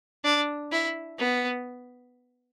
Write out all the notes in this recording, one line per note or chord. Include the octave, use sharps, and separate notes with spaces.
D4
E4
B3